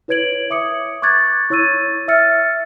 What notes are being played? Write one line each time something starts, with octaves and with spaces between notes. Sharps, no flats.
E4 B4 C#5 G#6 D7 F#7
E5 D6 D#6 C#7
C#6 D6 F#6 G#6 A6
E4 C#5 C#6 E6 A6 D#7
E5 E6 F6 A6 C#7